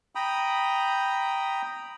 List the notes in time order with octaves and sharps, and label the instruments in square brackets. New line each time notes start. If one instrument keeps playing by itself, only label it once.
[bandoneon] G5 A#5 B5 D#6